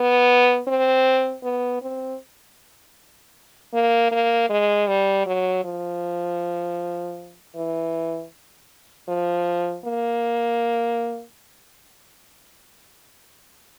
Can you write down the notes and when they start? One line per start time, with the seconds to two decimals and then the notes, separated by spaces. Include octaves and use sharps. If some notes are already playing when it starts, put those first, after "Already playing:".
Already playing: B3
0.68 C4
1.44 B3
1.82 C4
3.74 A#3
4.11 A#3
4.50 G#3
4.87 G3
5.26 F#3
5.64 F3
7.56 E3
9.08 F3
9.85 A#3